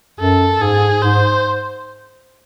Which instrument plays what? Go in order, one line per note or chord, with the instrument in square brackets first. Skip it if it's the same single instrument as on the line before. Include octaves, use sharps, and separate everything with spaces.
[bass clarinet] F#2 [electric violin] A4
[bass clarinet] G#2 [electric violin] G#4
[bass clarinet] G#2 [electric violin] C5